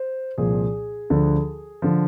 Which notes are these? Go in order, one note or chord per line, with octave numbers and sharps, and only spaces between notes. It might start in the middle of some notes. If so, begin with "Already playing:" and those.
Already playing: C5
C2 A#2 F3 G#4
D2 D3 F3
D3 F3